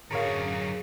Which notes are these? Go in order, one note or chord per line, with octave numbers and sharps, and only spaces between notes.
F#2 D3 F#3 G#4 A#4 C#5 F5